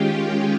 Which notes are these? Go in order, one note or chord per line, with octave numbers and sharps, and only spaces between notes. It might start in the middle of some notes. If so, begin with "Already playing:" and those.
Already playing: D#3 G#3 C#4 F4 G4 G5